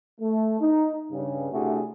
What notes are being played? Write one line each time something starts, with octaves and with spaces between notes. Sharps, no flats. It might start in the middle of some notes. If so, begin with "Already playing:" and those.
A3
D#4
G2 C#3
C3 A3 D4 E4 F#4 G#4